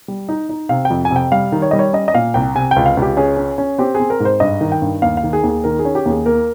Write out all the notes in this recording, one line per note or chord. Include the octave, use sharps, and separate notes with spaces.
G3
D#4
D#4
C3 F5
G5
F2
G#5
C3
G5
G3 F5
D#3
C#5
G3 D#5
C#5
C#4 D#5
D#5
A#2 F5
C2 G5
C3 G#5
G5
C#2
F5
C#2
G4
C#4 G#4
C#4
C#4
C4 G4
G#4
C4
A#4
G#2
C5
G2 D#5
D#3
G5
G2
D#2 F5
F5
D#3
G#4
D#2 G#4
D#3 A#4
G#4
C#4
G4
D#2 G#4
A#3 A#4